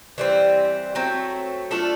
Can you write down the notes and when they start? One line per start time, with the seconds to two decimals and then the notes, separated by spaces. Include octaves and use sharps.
0.18 E3 G3 C4
0.95 F#3 A3 C4
1.71 A3 D4 F4 A4